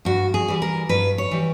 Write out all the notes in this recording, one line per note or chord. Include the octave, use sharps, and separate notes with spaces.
G2 F#4
G#4
E3 G3
A#4
G2 B4
C#5
E3 G3